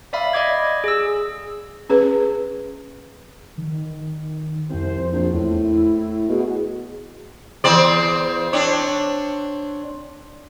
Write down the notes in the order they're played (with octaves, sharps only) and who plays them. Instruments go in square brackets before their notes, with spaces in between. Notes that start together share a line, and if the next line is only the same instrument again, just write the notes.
[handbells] D5 E5 F5 B5
D5 D#5 D6 G#6
G#4 E6
[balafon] C#4 G#4 B4
[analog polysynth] D#3
[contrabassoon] C2 [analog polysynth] F2 C5
[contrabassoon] A#1
[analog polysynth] E2 [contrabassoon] A2
[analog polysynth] E4
[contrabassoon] B2 [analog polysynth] F#4 G#4
[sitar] E2 C4 D5
C4 D4 C#5